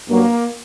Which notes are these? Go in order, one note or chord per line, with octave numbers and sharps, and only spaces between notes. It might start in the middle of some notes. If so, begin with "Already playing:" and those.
G2 F#3 A#3